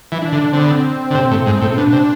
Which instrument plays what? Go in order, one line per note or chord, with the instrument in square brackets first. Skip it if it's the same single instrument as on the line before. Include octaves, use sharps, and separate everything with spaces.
[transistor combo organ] E3
[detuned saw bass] D4
[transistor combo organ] D3
[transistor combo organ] D3 [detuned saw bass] C4
[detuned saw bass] B3
C4
[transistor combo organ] D3
C3
A2
G#2
A2
[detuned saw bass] C4
[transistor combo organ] B2 [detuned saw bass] D4
[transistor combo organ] C3